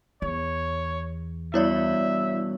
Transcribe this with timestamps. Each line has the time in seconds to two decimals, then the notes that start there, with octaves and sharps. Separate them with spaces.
0.22 E2 C#5
1.54 G2 B2 E3 E4 C#5 D5 E5